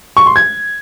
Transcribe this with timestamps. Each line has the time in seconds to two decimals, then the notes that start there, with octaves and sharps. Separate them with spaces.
0.17 C#6
0.26 C6
0.36 G#6